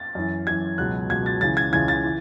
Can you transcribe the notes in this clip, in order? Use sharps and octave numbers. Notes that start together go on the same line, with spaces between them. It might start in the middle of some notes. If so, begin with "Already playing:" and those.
Already playing: A6
F#2 E3
F#2 E3 G#6
C#2 B2 F#3 F#6
C#2 B2 F#3 G#6
A6
C#2 C#3 E3 A6
G#6
C#2 C#3 E3 G#6
A6
E3